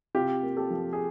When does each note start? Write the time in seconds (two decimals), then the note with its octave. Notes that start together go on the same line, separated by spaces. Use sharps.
0.15 C3 F4 G4
0.43 A#3
0.57 G4 A4
0.70 F3
0.93 G#4